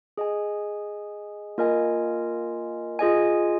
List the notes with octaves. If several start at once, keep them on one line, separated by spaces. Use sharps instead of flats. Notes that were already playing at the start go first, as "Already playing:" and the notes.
G#4 D#5 G#5
A#3 F4 A#4 D#5 G#5
F4 G#4 D#5 G#5